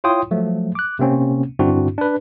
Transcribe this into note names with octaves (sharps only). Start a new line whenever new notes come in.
E4 F4 C#5 G5 C6 D#6
F3 F#3 A3
D6 F#6
C3 A#3 C4 C#4
G2 D3 C4 D4 E4 F#4
D4 B4